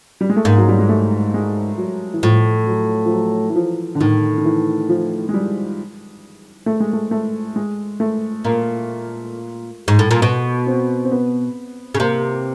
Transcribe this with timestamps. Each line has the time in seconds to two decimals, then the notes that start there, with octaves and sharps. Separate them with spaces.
0.21 G3
0.30 G#3
0.36 A3
0.45 G#2 A#3
0.58 F#3
0.68 G3
0.79 G#3
0.89 A3
1.34 G#3
1.78 F#3
2.14 E3
2.23 A2 F3
2.67 F#3
3.05 F3
3.12 F#3
3.50 E3
3.56 F3
3.95 D3
4.01 A2 D#3
4.38 D#3
4.45 E3
4.89 F3
5.29 G#3
5.34 G3
6.66 A3
6.80 G#3
6.93 A3
7.11 A3
7.56 G#3
8.00 A3
8.44 A#2 A#3
9.88 G#2
9.99 A2
10.11 A#2
10.22 B2 B3
10.67 C4
11.04 C4
11.12 B3
11.95 C#3
12.00 C3 A#3